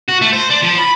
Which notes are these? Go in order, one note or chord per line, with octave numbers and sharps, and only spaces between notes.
F#4
A3
C5
D4
F3
B5